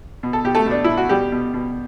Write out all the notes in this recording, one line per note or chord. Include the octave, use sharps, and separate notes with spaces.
B2
A4
B2 G4
A3 A4
B2 D4
B2 E4
F#4
B2 G3 G4
B2
B2